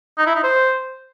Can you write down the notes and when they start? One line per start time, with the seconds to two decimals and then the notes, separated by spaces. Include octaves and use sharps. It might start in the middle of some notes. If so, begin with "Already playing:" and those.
0.18 D#4
0.27 E4
0.35 D#4
0.44 C5